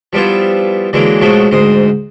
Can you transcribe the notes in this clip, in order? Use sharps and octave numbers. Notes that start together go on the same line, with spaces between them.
F3 G3 B3 E4 F4
D3 E3 F#3 G#3 A#3
B2 F3 F#3 G#3 A3
D2 G#2 C5 D#6